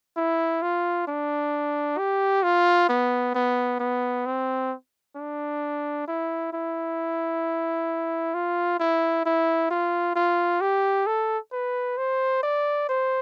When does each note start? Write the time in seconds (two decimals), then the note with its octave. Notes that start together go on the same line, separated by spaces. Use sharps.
0.17 E4
0.62 F4
1.07 D4
1.98 G4
2.43 F4
2.89 B3
3.35 B3
3.80 B3
4.26 C4
5.16 D4
6.07 E4
6.53 E4
8.34 F4
8.79 E4
9.26 E4
9.71 F4
10.16 F4
10.61 G4
11.07 A4
11.52 B4
11.98 C5
12.43 D5
12.89 C5